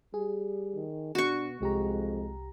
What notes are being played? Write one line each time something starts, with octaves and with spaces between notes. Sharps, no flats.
G3 G#4
D#3
B2 D4 F#4 C#6
C2 F2 G#3 G4 A#5